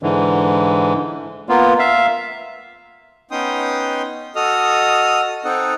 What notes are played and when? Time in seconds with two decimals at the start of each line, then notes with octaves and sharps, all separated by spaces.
0.03 G#2 D3 E3
1.49 A#3 B3 F4
1.79 E5 F5
3.31 B3 C#4 D#4 G5 C6 D#6
4.36 F#4 A4 D#5 D#6 F6
5.45 C4 D#4 A4 D#5 F#5